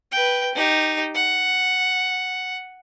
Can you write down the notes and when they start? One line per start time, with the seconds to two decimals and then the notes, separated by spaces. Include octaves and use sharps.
0.12 B4 G5
0.55 D#4 G4
1.14 F#5